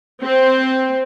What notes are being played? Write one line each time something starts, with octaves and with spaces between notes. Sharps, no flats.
C4